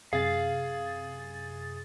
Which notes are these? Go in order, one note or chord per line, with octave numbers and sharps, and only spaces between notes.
F#2 C3 G#4 F5 A6